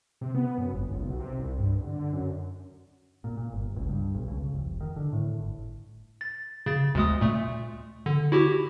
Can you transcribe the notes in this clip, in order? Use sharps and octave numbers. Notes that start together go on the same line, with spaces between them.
C3
B3
F#2
G1
C#2
B1
C3
C2
G2
D3
F#2
A#2
A#2
G1
C#2
G2
B1
C#2
F1
D#3
D3
A2
G1
A6
C#3 A6
D2 G#3 D#6
A#2 A3
D3
E4 F#4 G4